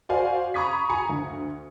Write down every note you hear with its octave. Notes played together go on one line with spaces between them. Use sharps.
F#4 C5 D5 F5 G#5
A#5 B5 C#6 D#6 G#6 B6
G#5 A#5 C#7
D2